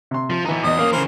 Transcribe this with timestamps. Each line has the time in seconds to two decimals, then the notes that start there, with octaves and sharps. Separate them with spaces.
0.11 C3 C6
0.30 F3
0.45 E3 B3 D#4 A#5
0.64 E2 D#5 D#6
0.79 A#3 C#4 F5
0.92 C#3 E3 A#4 C5